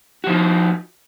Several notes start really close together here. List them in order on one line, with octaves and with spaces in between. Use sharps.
F#4 F3 D#4